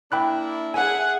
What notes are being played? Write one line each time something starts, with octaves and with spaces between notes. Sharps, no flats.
A#3 D4 E4 G5 B5 F#6
G#4 E5 F#5 G#5